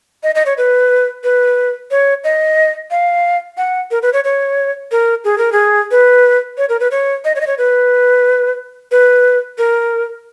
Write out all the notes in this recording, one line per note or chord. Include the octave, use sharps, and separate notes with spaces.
D#5
D#5
C#5
B4
B4
C#5
D#5
F5
F#5
A#4
B4
C#5
C#5
A#4
G#4
A#4
G#4
B4
C#5
A#4
B4
C#5
D#5
C#5
D#5
C#5
B4
B4
A#4